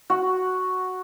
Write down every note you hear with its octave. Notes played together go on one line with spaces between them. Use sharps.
F#4